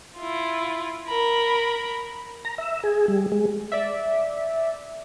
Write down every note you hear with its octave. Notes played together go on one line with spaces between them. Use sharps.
E4 F4
A#4 B5
A#5
E5
G#4
G3
G#3
D5 E5